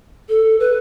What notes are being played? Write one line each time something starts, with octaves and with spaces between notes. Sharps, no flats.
A4
B4